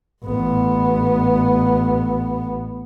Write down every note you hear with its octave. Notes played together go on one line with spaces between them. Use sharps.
A1 B3